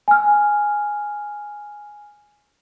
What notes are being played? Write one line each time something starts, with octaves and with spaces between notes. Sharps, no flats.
G#5 F6